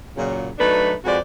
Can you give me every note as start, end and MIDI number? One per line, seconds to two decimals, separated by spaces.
0.17 0.49 46
0.17 0.49 49
0.17 0.49 54
0.59 0.93 54
0.59 0.93 57
0.59 0.93 62
0.59 0.93 63
0.59 0.93 71
1.04 1.17 41
1.04 1.17 56
1.04 1.17 66
1.04 1.17 71
1.04 1.17 72
1.04 1.17 74